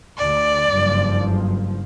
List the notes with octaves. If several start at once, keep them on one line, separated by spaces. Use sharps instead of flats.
D2 D5
F#1 G2 F3